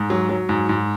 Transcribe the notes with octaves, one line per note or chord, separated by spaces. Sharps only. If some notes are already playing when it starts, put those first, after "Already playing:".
Already playing: G#2
F#3
F#3
G#2
G#2